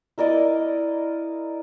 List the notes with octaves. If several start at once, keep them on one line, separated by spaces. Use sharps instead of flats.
E4 A#4 D5 D#5